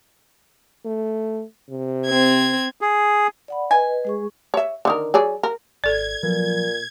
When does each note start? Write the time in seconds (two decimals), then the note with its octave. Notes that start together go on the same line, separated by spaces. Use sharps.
0.85 A3
1.70 C3
2.07 C4 G#6
2.81 G#4
3.48 D5 F#5 B5
3.71 B4 D#5 G#5
4.05 G#3 G#4 C#6
4.54 C#5 E5
4.85 D3 D#3 A#4
5.14 F#3 G#4 D5
5.43 A#4
5.84 G#1 A4 D5 G#6
6.23 A#2 F3 F#3 B4